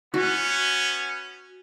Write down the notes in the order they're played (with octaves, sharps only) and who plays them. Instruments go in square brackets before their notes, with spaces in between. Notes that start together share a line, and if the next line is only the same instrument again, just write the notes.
[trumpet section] B3 C#4 [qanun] F#4